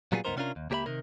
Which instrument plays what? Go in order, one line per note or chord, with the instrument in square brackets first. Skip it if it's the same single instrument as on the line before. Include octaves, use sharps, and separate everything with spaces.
[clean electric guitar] A#2 F#3 G3 B3 F4 G#4
C#2 G2 B3 D#4 A#4 C5
C3 B3 C#4 D4 F4 A#4
D#2
C#2 A#3 G4 A#4 E5 B5
C3 D#3 A#4